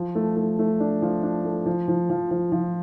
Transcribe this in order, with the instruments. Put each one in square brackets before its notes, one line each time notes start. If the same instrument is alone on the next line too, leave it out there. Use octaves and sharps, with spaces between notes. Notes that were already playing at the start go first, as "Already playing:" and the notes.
Already playing: [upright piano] F3
A3
A3
A3
D4
F3
D4
A3
F3
F3
F3
F3
F3